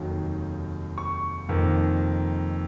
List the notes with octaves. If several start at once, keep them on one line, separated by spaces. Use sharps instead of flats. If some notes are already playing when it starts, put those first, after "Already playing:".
Already playing: F1 D#2 D#3 F#3
C#6
F1 F2 D#3 A#3